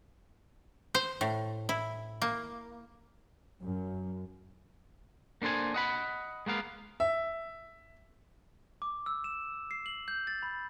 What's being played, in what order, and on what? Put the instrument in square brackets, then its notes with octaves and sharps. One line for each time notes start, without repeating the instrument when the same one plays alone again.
[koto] C5
A2
E4
A#3
[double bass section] F#2
[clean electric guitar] A#3 D4 A4 C5 G#5
D#5 F#5 B5
G#3 A#3 B3 F5
[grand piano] E5
[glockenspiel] D6
E6
E7
C7
F#7
G6
A6
B5